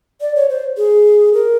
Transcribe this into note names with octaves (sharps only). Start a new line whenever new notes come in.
D5
C#5
C5
G#4
A#4